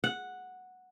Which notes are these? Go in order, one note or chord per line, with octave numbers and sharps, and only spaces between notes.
F#5